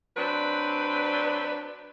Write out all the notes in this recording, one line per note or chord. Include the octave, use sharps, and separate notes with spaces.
F#3 C4 D4 B4